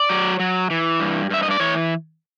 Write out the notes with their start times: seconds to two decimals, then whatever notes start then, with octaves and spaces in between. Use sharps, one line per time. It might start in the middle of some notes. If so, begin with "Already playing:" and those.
Already playing: D5
0.09 F#3
0.40 F#3
0.70 E3
1.00 G2
1.30 G2 E5
1.43 D#5
1.51 D5
1.60 E3 C#5